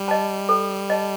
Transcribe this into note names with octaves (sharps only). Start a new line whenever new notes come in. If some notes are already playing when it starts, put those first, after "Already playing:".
Already playing: G3
D#5 A5
A4
D#5 A5